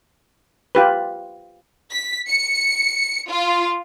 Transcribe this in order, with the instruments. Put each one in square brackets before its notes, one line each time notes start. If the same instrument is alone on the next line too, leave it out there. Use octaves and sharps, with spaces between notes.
[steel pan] F4 G4 B4
[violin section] B6
C#7
F4